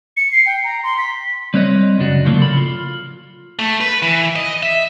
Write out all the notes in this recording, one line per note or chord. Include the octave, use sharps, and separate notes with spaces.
C#7
C7
G5
A#5
C6
B6
G3 C4 B4 C#5 D#5
C#2 F#2 C#3 D4 F#4
A2 C#3 F3 F#3 A#3
C#3 A4 B5
F4
A3
B4
E3
D#5
E5